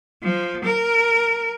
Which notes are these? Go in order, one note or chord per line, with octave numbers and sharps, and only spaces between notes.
F3
A#4